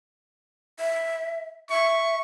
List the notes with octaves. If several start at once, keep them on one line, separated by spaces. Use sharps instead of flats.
E5
E5 C#6